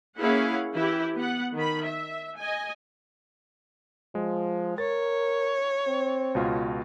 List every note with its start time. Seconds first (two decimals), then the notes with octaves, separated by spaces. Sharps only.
0.19 A#3 C#4 E4 G#4 F5 F#5
0.75 E3 E4 G4
1.16 B3 F#5
1.56 D#3 B5
1.85 E5
2.39 D#5 G#5
4.15 F3 G#3
4.78 A#4 C#5 A6
5.88 C4
6.35 C#2 B2 F4